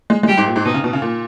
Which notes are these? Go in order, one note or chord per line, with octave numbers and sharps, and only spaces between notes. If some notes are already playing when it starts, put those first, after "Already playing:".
G#3
G#3
G3 G4
G#2
A#2
G#2
B2 D#4
C#3
B2
C#3
A#2